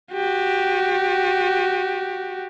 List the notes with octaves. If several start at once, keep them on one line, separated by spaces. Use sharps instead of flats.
F#4 G4